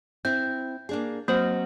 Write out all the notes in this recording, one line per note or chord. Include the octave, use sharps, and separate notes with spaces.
C4 E4 G6
A#3 D4 G#4
F#3 A#3 C4 C5